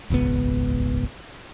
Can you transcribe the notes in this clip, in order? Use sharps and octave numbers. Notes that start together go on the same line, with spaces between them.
D#1 G#1 C#2 B3